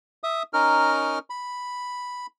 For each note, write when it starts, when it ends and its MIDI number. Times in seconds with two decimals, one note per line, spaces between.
0.24 0.43 76
0.24 0.43 87
0.53 1.19 61
0.53 1.19 63
0.53 1.19 70
0.53 1.19 89
1.30 2.27 83